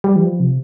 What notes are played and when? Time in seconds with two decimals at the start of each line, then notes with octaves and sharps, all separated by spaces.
0.04 G3
0.16 E3
0.22 F3
0.40 C3